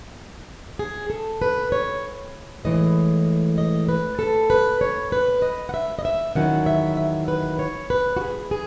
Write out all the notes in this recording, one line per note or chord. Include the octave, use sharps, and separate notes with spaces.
G#4
A4
B4
C#5
A2 E3 G#3 D#5
D#5
B4
A4
B4
C#5
B4
D#5
F#5
E5
D#5
E5
E2 D#3 F#3 C#4 E4 F#5
E5
E5
B4
C#5
B4
F#4
G#4
G#4